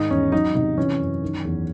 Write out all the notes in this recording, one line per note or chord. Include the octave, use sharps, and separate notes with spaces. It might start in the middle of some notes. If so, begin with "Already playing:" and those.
Already playing: G#2 D#3 D#4
E2 C#4
F#3 D#4
C3 D#4
E3 C#4
F#2
D#3
E2